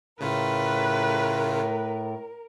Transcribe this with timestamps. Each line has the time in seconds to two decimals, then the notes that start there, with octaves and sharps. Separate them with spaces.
0.20 A2 C#3 A3 F4 A#4 B4